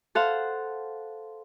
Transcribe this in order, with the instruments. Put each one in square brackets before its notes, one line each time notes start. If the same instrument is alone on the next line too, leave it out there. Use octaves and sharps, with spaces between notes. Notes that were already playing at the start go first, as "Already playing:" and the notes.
[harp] A4 C5 F5 F#5